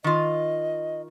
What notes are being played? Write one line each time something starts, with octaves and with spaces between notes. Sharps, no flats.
D#3 F4 D#5